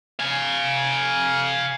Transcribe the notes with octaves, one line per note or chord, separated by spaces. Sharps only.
F5 G#5